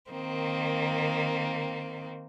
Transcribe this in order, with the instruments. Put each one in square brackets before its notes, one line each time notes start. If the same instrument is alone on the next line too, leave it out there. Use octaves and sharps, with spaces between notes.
[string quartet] D#3 A#3 C4